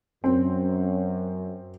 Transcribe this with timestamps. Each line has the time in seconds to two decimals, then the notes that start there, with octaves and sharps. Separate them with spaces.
0.24 F#2 C4